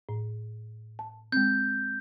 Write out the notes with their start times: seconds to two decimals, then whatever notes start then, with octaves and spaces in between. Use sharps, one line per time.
0.09 A2
0.99 A5
1.32 G#3 C4 G6